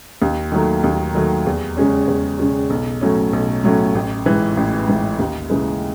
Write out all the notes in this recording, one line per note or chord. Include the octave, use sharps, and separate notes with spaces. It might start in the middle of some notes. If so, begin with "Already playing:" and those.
D#2
D#3 F#3 A3
D#2
D#3 F#3 A3
E2
C#3 G#3 C#4
E2
C#3 G#3 C#4
B1
A2 F#3 A3 C#4
B1
A2 F#3 A3 C#4
A1
G#2 E3
A1
G#2 E3
D#2
C#3 E3 G#3